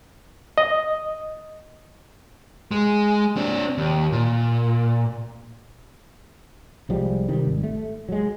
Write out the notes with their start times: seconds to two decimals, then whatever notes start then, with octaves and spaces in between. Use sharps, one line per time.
0.58 D#5
2.71 G#3
3.36 C4 D4
3.78 D#2
4.12 A#2
6.89 C2 F3 G3 G#3
7.28 C3 D#3 G3
7.47 G#1
7.64 A3
8.09 F#3 G#3